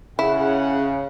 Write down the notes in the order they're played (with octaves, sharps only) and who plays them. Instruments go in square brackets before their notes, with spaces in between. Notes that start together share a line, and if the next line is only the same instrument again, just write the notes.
[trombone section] C#3 [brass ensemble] C#4 G#4 F#5 [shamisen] E4